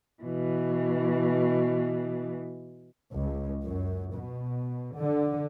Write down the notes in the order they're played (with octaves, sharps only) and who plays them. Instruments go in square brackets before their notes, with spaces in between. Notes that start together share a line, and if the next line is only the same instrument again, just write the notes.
[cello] B2 E3
[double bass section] C#2
F#2
B2
D3